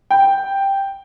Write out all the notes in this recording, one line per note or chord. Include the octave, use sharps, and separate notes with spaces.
G5